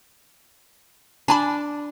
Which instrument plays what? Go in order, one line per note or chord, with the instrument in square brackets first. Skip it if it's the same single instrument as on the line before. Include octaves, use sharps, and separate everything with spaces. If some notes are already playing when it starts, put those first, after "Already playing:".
[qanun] D4 D5 [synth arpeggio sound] G#5 A5 B5